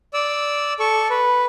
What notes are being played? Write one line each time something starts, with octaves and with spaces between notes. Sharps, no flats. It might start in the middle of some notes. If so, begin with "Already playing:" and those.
D5 E6
A4 C#6
B4